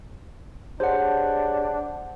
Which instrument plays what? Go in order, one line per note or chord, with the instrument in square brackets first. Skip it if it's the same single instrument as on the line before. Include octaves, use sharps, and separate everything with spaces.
[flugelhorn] D4 [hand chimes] G4 G#4 C#5 [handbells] C5 F#5